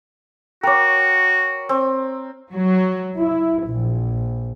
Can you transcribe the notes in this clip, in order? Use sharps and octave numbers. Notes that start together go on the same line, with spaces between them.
F#4 A#4 C#5 G5 D6
C4
F#3
E4
A#1